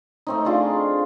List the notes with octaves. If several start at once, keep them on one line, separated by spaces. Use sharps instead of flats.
A3 C4 D#4
D4 F4 G#4 D5